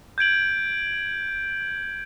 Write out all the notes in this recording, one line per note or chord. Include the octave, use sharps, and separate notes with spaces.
G6 G#6 D7 F#7